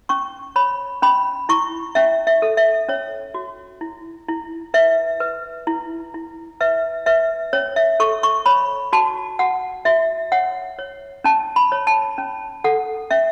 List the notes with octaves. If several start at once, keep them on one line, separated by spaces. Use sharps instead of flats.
C#4 C#6
C#5 B5
C#4 B5
E4 C#6
C#4 E5
E5
A4
E5
C#4 C#5
F#4
E4
E4
B4 E5
B4
E4
E4
B4 E5
B4 E5
C#4 C#5
E5
A4 C#6
C#6
C#5 B5
F#4 A5
F#4 F#5
F#4 E5
C#5 F#5
C#5
C#4 A5
B5
C#5
A5
C#4
A4 F#5
C#4 E5